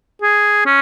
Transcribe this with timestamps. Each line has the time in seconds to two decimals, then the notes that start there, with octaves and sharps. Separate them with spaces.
0.22 G#4
0.66 C#4